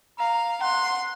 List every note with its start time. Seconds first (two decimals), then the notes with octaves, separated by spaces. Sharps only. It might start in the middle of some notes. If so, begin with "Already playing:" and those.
0.19 F5 A#5
0.61 F#5 C6